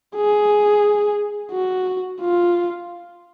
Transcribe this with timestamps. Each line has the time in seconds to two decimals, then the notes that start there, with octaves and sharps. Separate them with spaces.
0.16 G#4
1.52 F#4
2.21 F4